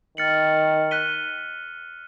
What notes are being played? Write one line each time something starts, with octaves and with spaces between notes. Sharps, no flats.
D#3 F6 A6 C#7 F#7
F#6 B6 D#7 G7